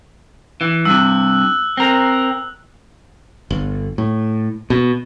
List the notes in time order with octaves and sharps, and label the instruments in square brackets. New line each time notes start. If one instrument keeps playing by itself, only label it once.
[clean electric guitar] E3
[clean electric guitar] G2 C3 [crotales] E6 F#6
[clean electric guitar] C4 A#4
[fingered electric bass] G1
A2
B2